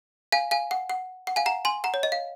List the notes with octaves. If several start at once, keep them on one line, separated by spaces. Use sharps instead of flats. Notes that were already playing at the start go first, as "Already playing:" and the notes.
F5 G#5
F5 G#5
F#5
F#5
F#5
F5 G#5
F#5 A#5
G#5 C6
F#5 A#5
C#5
D#5
F5